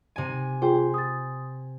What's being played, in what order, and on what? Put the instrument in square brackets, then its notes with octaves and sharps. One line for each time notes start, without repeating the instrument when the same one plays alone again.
[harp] C3 G#5
[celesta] F4 G#4 G5 [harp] C5
[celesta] D#6 A6